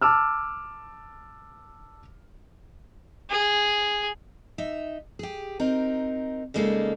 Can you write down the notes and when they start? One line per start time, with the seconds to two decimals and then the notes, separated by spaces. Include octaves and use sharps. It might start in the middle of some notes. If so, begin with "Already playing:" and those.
0.01 A5 D6 E6 F6
3.30 G#4
4.58 D#4 E5
5.19 G4 G#4
5.59 C4 D#4 A#4
6.54 C#3 G3 G#3 A#3 D#4 A4